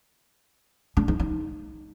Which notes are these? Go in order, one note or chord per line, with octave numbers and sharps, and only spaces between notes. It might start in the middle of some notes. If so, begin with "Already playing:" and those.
D4
D#4
D#4